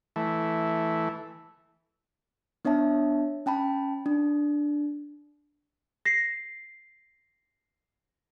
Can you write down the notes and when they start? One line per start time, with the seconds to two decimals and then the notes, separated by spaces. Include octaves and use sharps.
0.16 E3 A3
2.65 B3 D4 C#5 E5 A5
3.46 C#4 G5 A5 B5
4.06 D4
6.05 A#6 C7